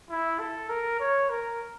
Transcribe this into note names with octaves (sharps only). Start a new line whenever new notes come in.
E4
A4
A#4
C#5
A#4